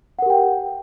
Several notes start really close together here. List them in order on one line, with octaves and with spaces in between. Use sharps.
F#5 A#4 G4 G5